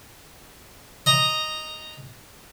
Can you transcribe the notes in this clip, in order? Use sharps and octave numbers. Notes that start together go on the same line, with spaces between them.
D#5 A#5